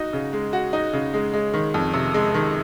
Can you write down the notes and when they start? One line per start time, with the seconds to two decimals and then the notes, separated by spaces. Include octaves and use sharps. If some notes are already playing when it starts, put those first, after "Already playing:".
Already playing: D#4 F#4
0.13 C#3
0.33 G#3
0.53 F#4
0.73 D#4
0.93 C#3
1.14 G#3
1.33 G#3
1.54 D#3
1.74 F2
1.94 C3
2.14 G#3
2.34 D#3